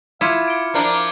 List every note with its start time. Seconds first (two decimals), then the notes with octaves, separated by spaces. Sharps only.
0.21 E4 F4 F5 D6 G#6 C#7
0.48 D7 G7
0.74 F3 D4 A#4
0.92 D6 C7